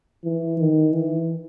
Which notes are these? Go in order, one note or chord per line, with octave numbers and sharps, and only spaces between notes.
E3
D#3
E3